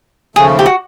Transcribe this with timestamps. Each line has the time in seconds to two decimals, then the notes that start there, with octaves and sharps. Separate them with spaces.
0.36 D#2 C#3 F3 A3 G#4
0.59 G4
0.66 F#4